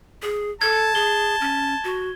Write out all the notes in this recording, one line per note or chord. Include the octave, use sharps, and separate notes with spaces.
G#4
A4 A5 G#6
G#4 G7
C#4
F#4